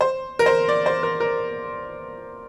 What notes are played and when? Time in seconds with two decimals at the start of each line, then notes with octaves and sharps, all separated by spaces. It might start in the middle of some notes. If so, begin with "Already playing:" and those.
0.01 C5
0.39 A#4
0.46 C5
0.68 D5
0.86 C5
1.03 A#4
1.20 A#4